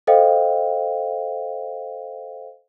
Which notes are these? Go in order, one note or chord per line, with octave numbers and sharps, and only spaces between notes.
A4 C5 D#5 F5 G5